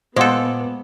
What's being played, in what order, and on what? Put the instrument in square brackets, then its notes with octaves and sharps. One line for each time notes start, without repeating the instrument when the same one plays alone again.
[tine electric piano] A#2 D6 [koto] G#3 A4 [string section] B3 [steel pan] C5 F5 F#5